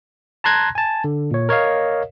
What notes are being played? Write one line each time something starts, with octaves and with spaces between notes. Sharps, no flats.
A5 A#5 C6 F#6 G#6 A#6
G#5 A5
D3
A#2 C#5
A#4 C#5 D#5 F5